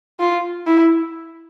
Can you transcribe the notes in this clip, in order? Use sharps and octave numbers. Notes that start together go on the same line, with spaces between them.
F4
E4